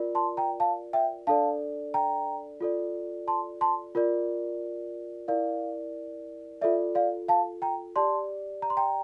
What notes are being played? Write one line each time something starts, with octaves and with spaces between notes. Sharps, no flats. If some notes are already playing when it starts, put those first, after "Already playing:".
Already playing: F4 A#4 D5
A5 C6
G5 A#5
F5 A5
E5 G5
D4 A4 D5 F5 A5
G5 A#5
F4 A4 D5
A5 C6
A5 C6
F4 A#4 D5
E4 A#4 D5 F5
F4 A4 D5 E5
D5 F5
F5 A5
G5 A#5
G4 D5 A5 C6
A#5
C6
G5 A#5